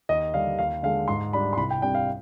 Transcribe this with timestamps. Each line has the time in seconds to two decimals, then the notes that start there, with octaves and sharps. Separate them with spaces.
0.09 D#2 D#5
0.34 D3 G3 D4 F5
0.59 D#2 F5
0.83 D3 G#3 F5
1.08 G#2 C6
1.33 G3 D4 B5
1.53 C6
1.57 C2 B5
1.71 G5
1.82 C3 G3 D4 G5
1.95 F5